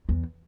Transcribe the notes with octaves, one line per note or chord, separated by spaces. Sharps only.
E2